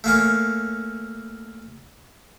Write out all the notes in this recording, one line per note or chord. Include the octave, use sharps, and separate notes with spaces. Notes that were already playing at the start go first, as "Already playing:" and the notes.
A3 A#3 C#4